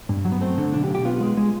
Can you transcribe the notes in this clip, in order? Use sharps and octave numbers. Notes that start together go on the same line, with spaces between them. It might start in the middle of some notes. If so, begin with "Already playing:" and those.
G2
F#3
B3
A3 C4
D3
B1 D4
G4
B1
G4
B3 F4
G#3
G#3